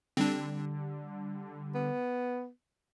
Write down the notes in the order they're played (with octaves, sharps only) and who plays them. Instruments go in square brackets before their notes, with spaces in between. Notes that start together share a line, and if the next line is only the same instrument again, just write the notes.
[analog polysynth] D3 G3 [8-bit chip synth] C4 D4
[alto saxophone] B3